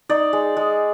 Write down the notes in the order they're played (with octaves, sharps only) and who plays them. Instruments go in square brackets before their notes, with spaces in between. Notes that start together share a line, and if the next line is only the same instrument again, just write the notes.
[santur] D#4 D5
G#3
G#3